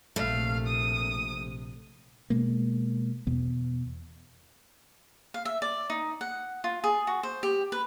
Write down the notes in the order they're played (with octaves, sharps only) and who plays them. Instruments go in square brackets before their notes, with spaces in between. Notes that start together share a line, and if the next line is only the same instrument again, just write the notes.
[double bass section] A#1 C3 [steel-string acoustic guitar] A3 [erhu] F5
[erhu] D#6
[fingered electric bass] B2 G#3 A#3
E2 B2 B3
[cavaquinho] F5
E5
D5
D#4
F#5
F4
G#4
F#4
C5
G4
B4